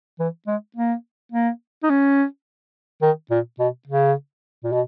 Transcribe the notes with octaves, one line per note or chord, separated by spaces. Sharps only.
E3
G#3
A#3
A#3
D#4
C#4
D#3
A#2
B2
C#3
A#2
B2